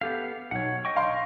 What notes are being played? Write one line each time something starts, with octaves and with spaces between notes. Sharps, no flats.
B3 G4 A4 F5
B1 C#5 F#5
D#5 G5 C#6
F5 C6 G6